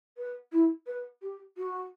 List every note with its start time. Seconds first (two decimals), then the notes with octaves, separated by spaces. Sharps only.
0.17 B4
0.52 E4
0.87 B4
1.22 G4
1.58 F#4